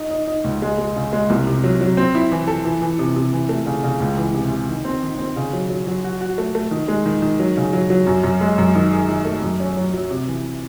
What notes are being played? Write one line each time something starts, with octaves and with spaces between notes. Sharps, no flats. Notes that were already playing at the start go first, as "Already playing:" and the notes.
Already playing: D#4
D#4
D#4
C#2
G#3
G#3
C#3
G#3
C2
C3
F#3
F#3
C4
E4
E3
A4
E3
E3
C3
C3
E3
A3
C#3
C#3
C#2
E3
C3
C3
D#3
C4
D#3
C4
C#3
F#3
F#3
F#3
F#4
F#4
A3
A3
D#3
G#3
D#3
D#3
F#3
C#3
F#3
F#3
F#2
F#2
G#3
F#2
D#3
G#4
D#3
A3
F#2
C#4
F#3
F#3
C3
E3